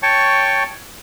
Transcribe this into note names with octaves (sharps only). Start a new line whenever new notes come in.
C#5 G5 A5 C#6